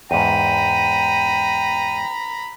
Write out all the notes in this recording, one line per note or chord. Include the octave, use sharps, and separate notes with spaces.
E2 G#2 G5 A#5 B5 D#7